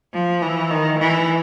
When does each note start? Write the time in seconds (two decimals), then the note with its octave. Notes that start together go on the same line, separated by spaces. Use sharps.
0.14 F3
0.42 E3
0.71 D#3
0.99 E3